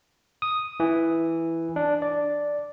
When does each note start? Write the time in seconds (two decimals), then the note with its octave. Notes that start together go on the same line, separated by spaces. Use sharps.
0.42 D#6
0.80 E3
1.76 D4
2.02 D5